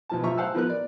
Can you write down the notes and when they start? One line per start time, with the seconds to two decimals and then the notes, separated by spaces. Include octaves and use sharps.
0.09 B1 F3 A5
0.23 F3 F4 E5 A#5 C#6
0.37 C5 F5 F#5 A5 E6
0.55 F3 B3 A#4 F#6
0.69 D5